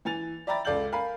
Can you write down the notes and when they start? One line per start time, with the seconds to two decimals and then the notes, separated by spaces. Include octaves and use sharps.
0.05 E3 G#5 A6 F7
0.47 D5 E5 G5 A#5 B5 A6
0.65 C#2 A4 D5 F5 G6 F#7
0.92 A#4 F5 G#5 B5